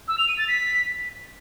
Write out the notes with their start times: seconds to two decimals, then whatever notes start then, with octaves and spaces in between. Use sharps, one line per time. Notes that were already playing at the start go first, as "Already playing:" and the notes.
0.08 E6
0.18 F7
0.28 D#7
0.38 A6
0.48 B6